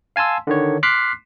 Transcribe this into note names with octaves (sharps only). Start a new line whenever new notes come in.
F5 G#5 A5 C6 E6
D3 D#3 C#5
C6 D6 F6 F#6 B6 C7